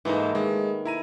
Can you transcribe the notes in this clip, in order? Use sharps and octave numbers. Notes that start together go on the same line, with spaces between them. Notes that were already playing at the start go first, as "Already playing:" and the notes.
G#2 E3 A3 A#3 D#4
D#3 G#3
E4 A#5 D#7